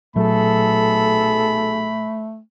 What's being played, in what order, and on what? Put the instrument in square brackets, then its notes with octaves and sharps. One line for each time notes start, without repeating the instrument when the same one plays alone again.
[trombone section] B1 G#4 A4 [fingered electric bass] A#2 F#3 [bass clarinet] A3 [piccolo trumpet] B5